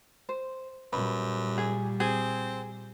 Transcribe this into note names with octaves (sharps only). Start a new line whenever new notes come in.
C5
F#2 A#2 G3 B4
G#4
C4 G#4